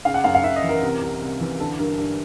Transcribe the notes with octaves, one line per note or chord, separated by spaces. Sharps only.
C#3 F5
F#5
F#2 F5
F5
F#2 E5
D#5
E3
A#4
C3
C2
C2
E3
D3 A4
G2 A#4
G2